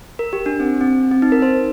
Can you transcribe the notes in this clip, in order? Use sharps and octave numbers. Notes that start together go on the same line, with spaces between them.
A#4
G4
D4
C4
C4
C4
D#4
A#4
C5